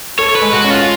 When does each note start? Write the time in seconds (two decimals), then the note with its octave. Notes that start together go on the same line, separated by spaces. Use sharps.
0.19 A4 C#5
0.36 B4
0.41 G#3
0.53 F#4
0.64 C#4
0.70 F4